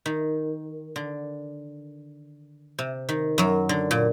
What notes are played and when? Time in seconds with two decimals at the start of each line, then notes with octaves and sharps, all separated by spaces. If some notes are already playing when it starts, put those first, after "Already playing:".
0.06 D#3
0.96 D3
2.79 C3
3.09 D#3
3.38 F#2 F#3
3.69 D3
3.91 A#2